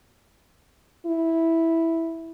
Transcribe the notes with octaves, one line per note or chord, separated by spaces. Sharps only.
E4